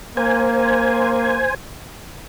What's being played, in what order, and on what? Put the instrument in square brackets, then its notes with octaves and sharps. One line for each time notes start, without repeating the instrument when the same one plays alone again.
[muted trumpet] A#3 [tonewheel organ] C5 G#5